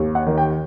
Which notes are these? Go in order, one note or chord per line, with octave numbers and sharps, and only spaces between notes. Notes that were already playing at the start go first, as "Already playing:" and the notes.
Already playing: D#2
F#5
D#3
G5